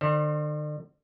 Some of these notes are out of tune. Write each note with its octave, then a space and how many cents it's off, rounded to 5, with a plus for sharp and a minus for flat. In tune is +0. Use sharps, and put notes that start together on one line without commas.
D3 +40 C5 +35